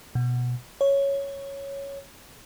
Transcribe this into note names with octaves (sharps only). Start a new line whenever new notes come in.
B2
C#5